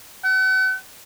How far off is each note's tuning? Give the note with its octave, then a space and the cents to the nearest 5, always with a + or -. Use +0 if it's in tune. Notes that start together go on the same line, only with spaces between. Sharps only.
F#5 +40